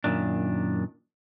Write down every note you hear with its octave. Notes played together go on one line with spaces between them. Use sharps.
F#2 A#2 D#3 D4